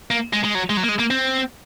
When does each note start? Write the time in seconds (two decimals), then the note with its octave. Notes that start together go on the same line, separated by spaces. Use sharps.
0.11 A#3
0.33 G#3
0.44 G#3
0.55 F#3
0.70 G#3
0.77 F#3
0.83 A#3
0.89 G#3
0.99 A#3
1.11 C4